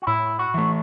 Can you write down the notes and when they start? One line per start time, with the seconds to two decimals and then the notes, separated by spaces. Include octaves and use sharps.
0.02 F#4
0.07 A2 E4
0.39 F#4
0.54 E3 A3